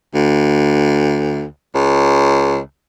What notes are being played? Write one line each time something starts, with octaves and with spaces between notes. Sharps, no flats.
D2
C#2